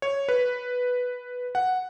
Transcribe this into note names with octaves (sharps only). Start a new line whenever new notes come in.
C#5
B4
F#5